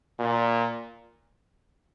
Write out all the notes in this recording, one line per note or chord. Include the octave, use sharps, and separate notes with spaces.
A#2